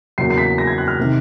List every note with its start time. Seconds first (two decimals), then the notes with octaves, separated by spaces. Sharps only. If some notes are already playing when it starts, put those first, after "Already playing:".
0.18 E2 C#3 F#3 A#3 C7
0.30 C7
0.38 B6
0.58 A#6
0.67 G#6
0.78 F#6
0.88 F6
0.99 C3 D#3